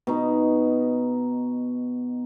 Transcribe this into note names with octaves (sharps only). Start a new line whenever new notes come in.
B2 D#4